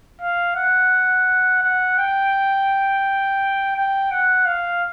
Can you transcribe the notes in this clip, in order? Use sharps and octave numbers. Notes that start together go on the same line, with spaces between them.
F5
F#5
F#5
G5
G5
F#5
F5